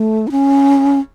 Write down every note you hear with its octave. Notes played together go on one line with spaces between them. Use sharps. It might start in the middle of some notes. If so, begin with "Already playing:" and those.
Already playing: A3
E4
C#4